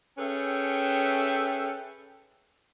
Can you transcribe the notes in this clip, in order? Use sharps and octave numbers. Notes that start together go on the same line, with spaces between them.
C#4 G#4 A4 B4 E5 G5